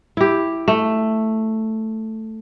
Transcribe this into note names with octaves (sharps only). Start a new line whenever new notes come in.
E4 G4
A3